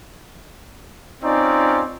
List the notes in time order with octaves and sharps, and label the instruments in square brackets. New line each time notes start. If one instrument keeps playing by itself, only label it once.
[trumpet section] C4 C#4 D#4 F4 D5